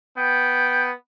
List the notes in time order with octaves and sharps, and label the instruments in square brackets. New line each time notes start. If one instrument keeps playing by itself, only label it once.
[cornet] B3 [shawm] G5